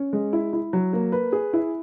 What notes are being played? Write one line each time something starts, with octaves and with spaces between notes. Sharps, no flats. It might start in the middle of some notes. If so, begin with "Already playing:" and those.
Already playing: C#4
G#3
E4
E4
F#3
A#3
B4
G#4
E4